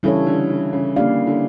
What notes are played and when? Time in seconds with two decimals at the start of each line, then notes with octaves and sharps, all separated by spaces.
0.03 C#3 E3 G3 D4 A4 C#5
0.27 D3
0.50 D3
0.73 C#3
0.96 D3 A#3 D4 G4 D5 F5
1.27 D3